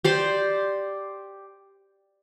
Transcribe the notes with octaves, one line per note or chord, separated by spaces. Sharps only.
G4 C5 D5